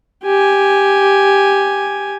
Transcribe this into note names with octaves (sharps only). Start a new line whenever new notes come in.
G4 G#5